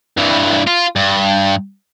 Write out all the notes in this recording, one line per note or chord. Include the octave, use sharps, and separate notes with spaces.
G2 E3
F4
G2